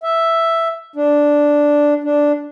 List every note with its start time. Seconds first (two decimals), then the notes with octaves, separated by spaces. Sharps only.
0.03 E5
0.96 D4
2.04 D4